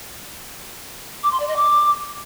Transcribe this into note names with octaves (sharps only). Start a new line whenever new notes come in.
D6
C6
D5
D#5
D6